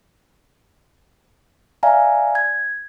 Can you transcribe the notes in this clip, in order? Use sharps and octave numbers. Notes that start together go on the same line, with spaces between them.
D5 E5 F5 G#5 A#5
G#6